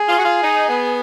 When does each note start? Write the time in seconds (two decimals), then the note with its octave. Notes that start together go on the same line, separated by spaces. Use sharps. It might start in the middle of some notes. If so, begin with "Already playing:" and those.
Already playing: G#4
0.08 F4
0.18 F#4
0.25 F4
0.43 D#4
0.69 B3